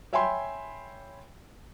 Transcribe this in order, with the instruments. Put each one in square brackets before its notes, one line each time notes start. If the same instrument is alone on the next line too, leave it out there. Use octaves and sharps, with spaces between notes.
[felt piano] C#5 E5 G5 G#5 B5 C6